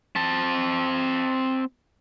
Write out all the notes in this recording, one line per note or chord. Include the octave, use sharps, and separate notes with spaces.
C4 A5